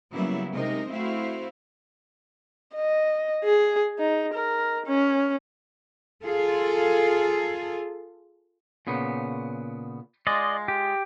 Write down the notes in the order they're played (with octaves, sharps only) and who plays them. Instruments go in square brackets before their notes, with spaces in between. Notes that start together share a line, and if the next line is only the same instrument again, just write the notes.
[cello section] C#3 F#3 G3 A#3 B3 E4
C3 G#3 D#4 A#4 C5 D#5
A3 C4 E4 F#4 C5 F5
[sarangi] D#5
G#4
D#4
A#4
C#4
[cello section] F4 G#4 A4
[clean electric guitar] A#2 C#3 B3
[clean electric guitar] G#3 F4 [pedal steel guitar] D5 D#5
[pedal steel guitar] G4